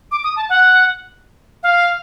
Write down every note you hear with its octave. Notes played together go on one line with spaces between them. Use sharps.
D6
D#6
A5
F#5
F5